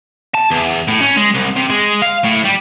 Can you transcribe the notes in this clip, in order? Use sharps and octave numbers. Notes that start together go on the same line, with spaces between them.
A5
E2
A2
C#4
G#3
C2
C3
G#3
F5
A2
G3